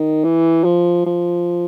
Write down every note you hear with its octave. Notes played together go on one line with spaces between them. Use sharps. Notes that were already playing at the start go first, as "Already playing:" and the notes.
Already playing: D#3
E3
F3
F3